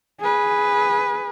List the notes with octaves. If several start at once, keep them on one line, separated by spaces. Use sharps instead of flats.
G#4 B4